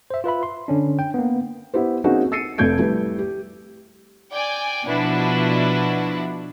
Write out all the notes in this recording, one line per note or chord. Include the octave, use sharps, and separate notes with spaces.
C5 E5
F4 B4 E5 B5
C6
D3 C#4 D4
G5
A#3 B3
B3 E4 G4 C5
A#3 C4 C#4 D#4 F#4 G#4
E6 A6 C7 C#7 D#7
F1 C3 A3 G6 G#6 D7
G3 A3 E4 B4
G4
D5 G5 G#5
B2 F3 D4 E4 F#4 B4